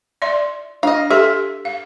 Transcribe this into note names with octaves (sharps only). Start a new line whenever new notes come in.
D5 E5 C6
D4 D#5 F5
G4 A4 E5 C6
F5